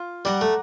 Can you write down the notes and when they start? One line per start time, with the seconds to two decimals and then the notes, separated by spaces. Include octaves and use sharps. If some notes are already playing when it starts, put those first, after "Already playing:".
Already playing: F4
0.25 G3 D5 F#5 A#5
0.41 A3